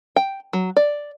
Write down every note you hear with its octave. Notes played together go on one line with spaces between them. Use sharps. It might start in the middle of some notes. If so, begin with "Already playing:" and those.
G5
F#3
D5